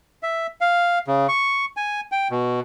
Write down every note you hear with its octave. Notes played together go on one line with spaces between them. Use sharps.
E5
F5
C#3
C#6
G#5
G5
B2